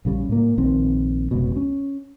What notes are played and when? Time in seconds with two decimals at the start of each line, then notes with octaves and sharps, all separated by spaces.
0.05 A#1 C#3 G3 C#4
0.29 A2 A#3
0.58 A#1 D#3 C4
1.31 F1 C#2 B2
1.56 C#4